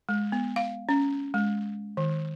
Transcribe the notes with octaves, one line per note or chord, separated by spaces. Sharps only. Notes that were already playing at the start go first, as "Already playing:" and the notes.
G#3
B3
F5
C#4
G#3
D#3